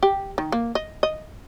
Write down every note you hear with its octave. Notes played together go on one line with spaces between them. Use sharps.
G4
D#3
A#3
D#5
D#5